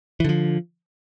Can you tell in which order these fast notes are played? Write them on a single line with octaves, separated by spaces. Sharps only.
E3 D3 F3